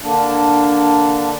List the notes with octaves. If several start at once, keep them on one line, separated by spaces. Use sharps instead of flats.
D3 A#3 D4